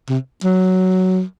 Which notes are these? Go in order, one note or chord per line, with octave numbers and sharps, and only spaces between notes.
C3
F#3